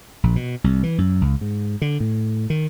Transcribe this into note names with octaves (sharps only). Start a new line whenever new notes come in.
A#1
B2
C2
E3
F#2
C#2
G#2
D3
A2
D#3